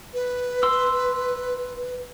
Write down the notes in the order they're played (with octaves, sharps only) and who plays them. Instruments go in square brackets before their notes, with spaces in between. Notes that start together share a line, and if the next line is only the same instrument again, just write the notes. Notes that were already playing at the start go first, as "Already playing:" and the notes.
[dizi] B4
[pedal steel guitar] C6 E6